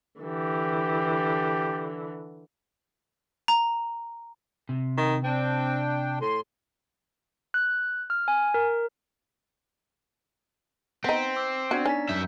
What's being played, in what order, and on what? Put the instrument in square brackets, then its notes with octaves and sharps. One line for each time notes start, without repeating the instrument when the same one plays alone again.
[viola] D3 E3 [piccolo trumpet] G4
[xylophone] A#5
[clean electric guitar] C3
[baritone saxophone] D#3
[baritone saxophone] C4 [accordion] D4 G5
[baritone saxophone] A2 [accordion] C6
[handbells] F#6
F6
G#5
A#4
[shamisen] B3 D#4 [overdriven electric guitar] C4 [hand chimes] B6
[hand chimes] D6 E6
[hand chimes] B3 D4 D5 [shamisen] F#4
[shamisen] C#4 [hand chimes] D#4 A#5 B6
[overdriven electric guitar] F#2 E5 [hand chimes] G6